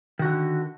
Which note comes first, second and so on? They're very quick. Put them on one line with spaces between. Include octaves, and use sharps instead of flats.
D#3 F#4 D3